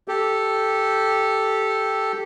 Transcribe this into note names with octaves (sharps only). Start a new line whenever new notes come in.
G4 A4